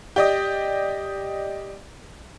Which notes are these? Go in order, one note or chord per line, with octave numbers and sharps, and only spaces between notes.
G4 D5 D#5